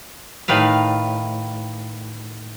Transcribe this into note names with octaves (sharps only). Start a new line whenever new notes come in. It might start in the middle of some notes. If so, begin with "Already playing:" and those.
A2 D#3 B4 F5